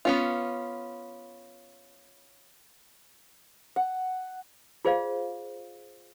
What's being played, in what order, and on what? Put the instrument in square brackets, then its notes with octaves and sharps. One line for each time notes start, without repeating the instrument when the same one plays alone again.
[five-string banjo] B3 C#4 F4
[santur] F#5
[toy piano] F4 G#4 C5 D5 F5